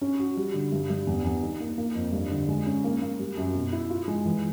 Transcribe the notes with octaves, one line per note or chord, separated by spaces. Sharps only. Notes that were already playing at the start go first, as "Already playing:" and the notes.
C#4
F#4
G3
D3
G2
G2
E2
E2
D#4
A#3
A#3
F2
G2
D3
G#3
C#4
A#3
A#3
G3
F#2
B2
E4
F4
G#3
E3